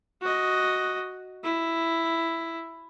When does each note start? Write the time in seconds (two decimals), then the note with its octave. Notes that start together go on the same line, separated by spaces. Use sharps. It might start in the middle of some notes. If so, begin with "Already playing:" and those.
0.21 F#4 D#5
1.43 E4